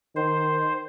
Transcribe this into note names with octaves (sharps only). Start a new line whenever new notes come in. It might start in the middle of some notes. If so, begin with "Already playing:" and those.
D#3 C5